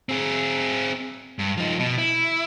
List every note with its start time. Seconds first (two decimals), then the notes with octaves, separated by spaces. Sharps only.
0.09 C4 G#4
1.39 G2
1.57 F3 D#4
1.80 B2
1.98 E4